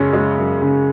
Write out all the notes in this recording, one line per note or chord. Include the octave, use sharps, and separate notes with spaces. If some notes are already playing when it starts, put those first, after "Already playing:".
Already playing: F#2 C#3 G#3 C#4
G#3
F#2
C#3